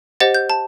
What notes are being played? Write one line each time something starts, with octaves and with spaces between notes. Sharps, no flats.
G4 C5 D#5 F#5 A6
G6
A5